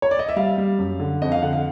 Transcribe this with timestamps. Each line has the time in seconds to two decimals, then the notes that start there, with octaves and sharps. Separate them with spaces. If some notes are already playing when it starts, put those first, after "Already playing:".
0.02 C#5
0.11 D5
0.19 D#5
0.29 E5
0.36 G3 F5
0.58 G3
0.78 F#2
1.00 D3
1.22 F2 D#5
1.32 F5
1.42 D3 F#5
1.53 F5